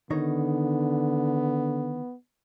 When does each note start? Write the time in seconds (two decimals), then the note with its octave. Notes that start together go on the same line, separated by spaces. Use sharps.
0.10 D3 D#3 B3 D#4 C#5